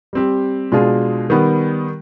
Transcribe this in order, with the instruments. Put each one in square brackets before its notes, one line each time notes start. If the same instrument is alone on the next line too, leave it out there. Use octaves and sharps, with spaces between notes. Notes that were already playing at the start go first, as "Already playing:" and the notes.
[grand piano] G3 C4 G4
B2 G#3 D4 F4 G#4
D#3 G3 B3